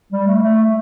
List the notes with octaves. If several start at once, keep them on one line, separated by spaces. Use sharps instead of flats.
G3
A3
A3